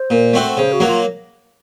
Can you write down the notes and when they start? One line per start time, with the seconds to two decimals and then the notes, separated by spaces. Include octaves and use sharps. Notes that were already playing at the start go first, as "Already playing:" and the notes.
Already playing: C5
0.10 A#2
0.33 A3 C4 F#4
0.57 C#3 C5
0.72 F#4
0.80 F#3 A#3
0.87 F4